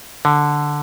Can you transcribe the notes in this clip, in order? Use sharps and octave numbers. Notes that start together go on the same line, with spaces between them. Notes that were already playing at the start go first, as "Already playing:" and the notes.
D3